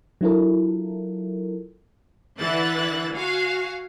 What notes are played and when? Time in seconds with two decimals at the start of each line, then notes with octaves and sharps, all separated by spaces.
0.21 F#3 D4 E4 F4 A4 A#4
2.39 D3 E3 E5 F#6 A6
3.14 F#4 F5 G#5